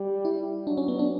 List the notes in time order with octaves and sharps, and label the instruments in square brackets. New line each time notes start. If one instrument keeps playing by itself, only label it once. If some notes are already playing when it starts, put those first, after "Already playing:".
Already playing: [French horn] G3
[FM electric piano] E4
[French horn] F#3 [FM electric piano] D4
[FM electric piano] C#4
B3
D4